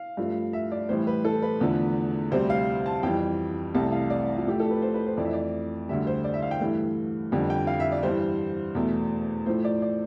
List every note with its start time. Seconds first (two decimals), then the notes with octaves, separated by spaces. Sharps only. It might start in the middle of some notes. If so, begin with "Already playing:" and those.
Already playing: F5
0.17 G2 F3 A3
0.53 E5
0.72 D5
0.89 A2 E3 G3 C5
1.07 B4
1.25 A4
1.42 B4
1.60 E2 D3 F3 A3
2.32 D2 C3 G3 C5
2.50 F5
2.86 A5
3.03 F2 E3 G3 G5
3.75 C2 C3 E3 A3 A5
3.92 F5
4.10 D5
4.37 F4
4.46 A2 F3 A3 G4
4.60 A4
4.71 B4
4.82 C5
4.94 B4
5.06 C5
5.17 F2 E3 A3 D5
5.25 E5
5.33 D5
5.89 D2 D3 G3 E5
6.07 C5
6.24 D5
6.34 E5
6.42 F5
6.51 G5
6.60 G2 E3 A3
7.32 F2 D3 G3
7.50 G5
7.67 F5
7.80 E5
7.92 D5
8.03 G2 E3 G3 C5
8.75 E2 B2 A3
9.46 A2 F3 A3 C5
9.65 D5
9.82 D5